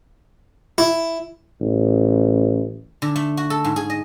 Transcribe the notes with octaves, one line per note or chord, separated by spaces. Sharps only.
E4
A1
D3
A3
F#4
A4
G#2
G#4
D#5